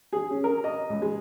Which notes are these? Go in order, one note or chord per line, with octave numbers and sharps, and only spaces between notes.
G#4
C#4
A#4
D#5
C#2
G#3